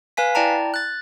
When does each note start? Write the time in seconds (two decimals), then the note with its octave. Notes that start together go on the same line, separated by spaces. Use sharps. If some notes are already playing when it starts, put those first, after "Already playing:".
0.17 B4 F5 G#5 B6
0.35 E4 D5 G5 A5 A#5
0.74 F#6 A6